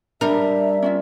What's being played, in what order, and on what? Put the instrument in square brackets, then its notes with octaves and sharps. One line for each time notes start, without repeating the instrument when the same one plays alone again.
[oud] G3 A#4 [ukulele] D4 [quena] E5
[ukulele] C#4 F4 E5